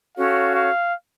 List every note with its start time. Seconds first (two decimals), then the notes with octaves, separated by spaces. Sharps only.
0.17 C#4 F#4 A4 C#5 F5
0.54 F5